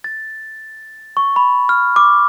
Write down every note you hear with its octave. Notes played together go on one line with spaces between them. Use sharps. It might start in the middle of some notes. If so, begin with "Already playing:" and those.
A6
C#6
B5
F6
D6